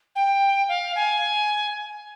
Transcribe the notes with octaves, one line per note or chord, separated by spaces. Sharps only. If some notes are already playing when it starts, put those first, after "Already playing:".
G5
F5
G#5